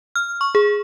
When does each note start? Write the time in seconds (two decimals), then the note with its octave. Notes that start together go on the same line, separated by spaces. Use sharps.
0.16 F6
0.41 C#6
0.55 G#4